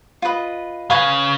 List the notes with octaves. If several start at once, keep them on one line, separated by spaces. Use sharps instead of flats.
F4 B4 D#5
C#3 B4 F5 G#5 C#6